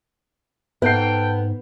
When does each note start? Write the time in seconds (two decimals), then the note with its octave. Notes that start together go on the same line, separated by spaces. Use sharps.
0.82 G#2 B3 A4 B4 F#5 G5 C7